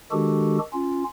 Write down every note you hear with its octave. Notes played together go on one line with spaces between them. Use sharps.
D#3 G#3 D4 F#4 G4 A4
C#4 F4